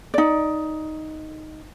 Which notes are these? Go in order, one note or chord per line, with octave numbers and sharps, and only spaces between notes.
D#4 D5